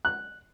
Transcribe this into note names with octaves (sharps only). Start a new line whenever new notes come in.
F#6